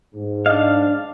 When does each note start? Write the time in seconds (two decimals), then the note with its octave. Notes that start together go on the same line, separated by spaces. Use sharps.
0.15 G#2
0.46 D4 D#5 F5